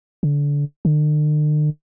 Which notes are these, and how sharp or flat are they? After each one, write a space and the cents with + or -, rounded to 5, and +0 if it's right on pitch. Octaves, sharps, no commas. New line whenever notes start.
D3 -25
D3 +45